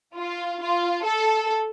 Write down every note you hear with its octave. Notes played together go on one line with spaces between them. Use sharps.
F4
F4
A4